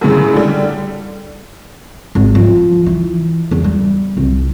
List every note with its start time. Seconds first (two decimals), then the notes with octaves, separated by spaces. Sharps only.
0.01 F#2 A2 C#3
0.33 D3 G3
2.15 G#1
2.35 F3
2.86 E3
3.51 E2
3.64 G3
4.17 C2